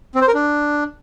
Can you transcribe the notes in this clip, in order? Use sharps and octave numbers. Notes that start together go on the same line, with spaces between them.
C4
C5
A#4
D4